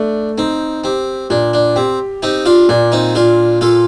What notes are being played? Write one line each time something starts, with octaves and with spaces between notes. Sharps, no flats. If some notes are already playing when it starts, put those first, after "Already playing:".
Already playing: A3 D4
C4 D#4
C4 G4
A#2 D4
D4
C4 G4
C4 D#4 G4
D4 F4
A#2 D4
C4 D#4
A#2 D4 F4
A#2 F4 A4